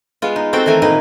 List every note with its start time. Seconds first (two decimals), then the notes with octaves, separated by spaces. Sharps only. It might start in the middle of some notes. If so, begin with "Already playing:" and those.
0.22 G#3 B3 F4
0.36 D#4
0.53 C4 F#4 A4 C5 G5
0.66 D#3 E3 A3 G#5 A#5
0.82 A#2 D#3 D#4 B4